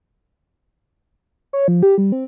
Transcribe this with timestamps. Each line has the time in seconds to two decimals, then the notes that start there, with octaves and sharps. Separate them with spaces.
1.53 C#5
1.68 F3
1.83 G4
1.98 G3
2.12 C4